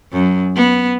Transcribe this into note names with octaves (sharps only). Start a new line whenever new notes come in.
F#2
B3